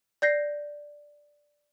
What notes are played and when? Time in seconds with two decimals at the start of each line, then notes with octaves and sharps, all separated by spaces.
0.22 D5 G6 A#6 C7